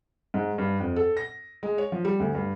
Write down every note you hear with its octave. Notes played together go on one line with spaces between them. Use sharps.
G#2
G2
F2
A4
A#6
G#3
C#5
F3
G3
D2
G2